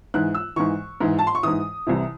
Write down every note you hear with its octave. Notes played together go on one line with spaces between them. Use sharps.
G#2 E3 F#6
E6
G#2 E3 C#6
G#2 E3
A5
C6
C#6
G#2 E3 D#6
C2 C3 E3